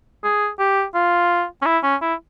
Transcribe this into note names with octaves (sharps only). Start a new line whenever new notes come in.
G#4
G4
F4
C#4
E4
C#4
E4